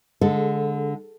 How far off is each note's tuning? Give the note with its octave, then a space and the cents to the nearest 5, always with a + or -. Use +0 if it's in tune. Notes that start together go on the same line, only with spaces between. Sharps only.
D3 -15 G#3 +0 A4 +5